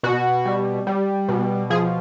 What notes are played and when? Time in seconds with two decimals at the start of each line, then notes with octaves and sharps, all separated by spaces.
0.03 B2 F#4
0.46 G3
0.87 G3
1.28 B2
1.70 F3 G#4